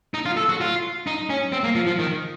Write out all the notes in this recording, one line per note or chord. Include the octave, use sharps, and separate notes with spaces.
D#4
F4
A4
F#4
F4
D#4
C#4
C4
A#3
F3
F3
D#3